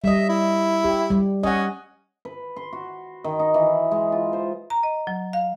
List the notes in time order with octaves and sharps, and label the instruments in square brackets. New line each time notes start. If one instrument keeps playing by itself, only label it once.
[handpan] G3 D#5 [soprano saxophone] E5
[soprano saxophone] E4
[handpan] G4
G3
[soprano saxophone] C#4 [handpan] D#5 F#5
[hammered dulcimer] B4
C6
F#4
D#3
D#4
E3
G#3
F4
C5
[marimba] A#5
D#5
F#3
F5